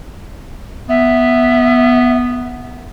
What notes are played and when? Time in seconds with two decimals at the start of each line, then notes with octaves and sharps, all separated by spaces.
0.89 B3 E5